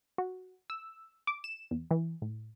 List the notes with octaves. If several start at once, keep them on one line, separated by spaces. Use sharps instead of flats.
F#4
E6
D6
E7
E2
E3
A2